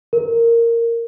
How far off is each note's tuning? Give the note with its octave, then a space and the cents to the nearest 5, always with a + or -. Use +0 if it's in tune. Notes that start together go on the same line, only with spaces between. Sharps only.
A#4 -10